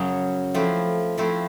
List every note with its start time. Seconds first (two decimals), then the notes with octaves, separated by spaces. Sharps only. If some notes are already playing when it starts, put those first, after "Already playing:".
Already playing: F#2 C#3 F#3
0.54 F3 A3 C4 E4
1.18 F3 A3 C4 E4